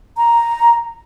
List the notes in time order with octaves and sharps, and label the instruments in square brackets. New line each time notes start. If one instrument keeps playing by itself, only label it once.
[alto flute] A#5